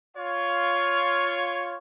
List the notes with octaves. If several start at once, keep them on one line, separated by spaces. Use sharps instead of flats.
F4 C#5